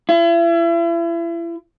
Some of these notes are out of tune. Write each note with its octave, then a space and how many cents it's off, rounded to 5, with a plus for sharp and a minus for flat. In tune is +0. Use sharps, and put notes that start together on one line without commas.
E4 +35